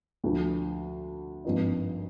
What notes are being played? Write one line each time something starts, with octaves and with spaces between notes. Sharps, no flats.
D2 D3 F3
G#1 G2 F3 A#3 D#4